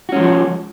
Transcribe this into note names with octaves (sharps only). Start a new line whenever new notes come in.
F3 G#3 C#4 F#4